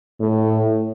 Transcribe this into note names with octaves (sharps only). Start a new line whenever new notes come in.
A2